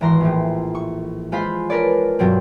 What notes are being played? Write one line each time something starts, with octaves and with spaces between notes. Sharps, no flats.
G#1 E3 A#5 C6
A#1 A2
C#6
G#3 F4 C5 F5 B5
D4 A#4 B4 C#5 D5
G2 B2 F#3 C4